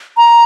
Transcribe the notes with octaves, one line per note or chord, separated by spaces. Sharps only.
A#5